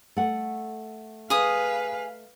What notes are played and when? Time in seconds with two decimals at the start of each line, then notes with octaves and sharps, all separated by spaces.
0.17 A3 F#5
1.30 G#4 B4 F5 D#6